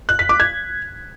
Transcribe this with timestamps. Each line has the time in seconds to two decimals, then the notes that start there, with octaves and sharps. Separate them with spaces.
0.09 F#6
0.19 B6
0.29 D6
0.40 G#6